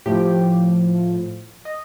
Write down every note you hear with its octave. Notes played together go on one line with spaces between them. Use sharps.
A2 F3 G4
D#5